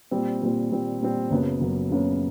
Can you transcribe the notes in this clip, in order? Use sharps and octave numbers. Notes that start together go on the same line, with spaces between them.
A#2 G3 C4
A#2 G3 C4
A#2 G3 C4
A#2 G3 C4
F#1 F#2 C#3 F#3 B3
F#1 F#2 C#3 F#3 B3
F#1 F#2 C#3 F#3 B3